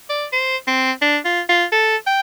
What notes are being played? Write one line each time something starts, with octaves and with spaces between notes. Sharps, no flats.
D5
C5
C4
D4
F4
F4
A4
G5